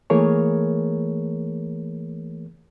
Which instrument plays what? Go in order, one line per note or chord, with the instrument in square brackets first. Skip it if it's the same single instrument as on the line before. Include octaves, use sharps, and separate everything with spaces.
[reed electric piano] E3 A3 A#3 G#4 A#4 C#5